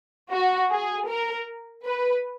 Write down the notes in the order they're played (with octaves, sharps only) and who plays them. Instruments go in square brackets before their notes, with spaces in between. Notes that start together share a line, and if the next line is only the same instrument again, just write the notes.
[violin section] F#4
G#4
A#4
B4